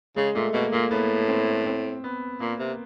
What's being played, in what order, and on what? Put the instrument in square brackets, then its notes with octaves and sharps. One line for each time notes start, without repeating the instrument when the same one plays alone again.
[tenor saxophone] C#3 [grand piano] G#3
[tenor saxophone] A#2 [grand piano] A3
[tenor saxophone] B2 [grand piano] A#3
[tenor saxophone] A#2 [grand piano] A#3
[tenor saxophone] A2 [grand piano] B3
[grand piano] C4
C4
B3
[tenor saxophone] A#2 [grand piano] A#3
[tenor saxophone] C3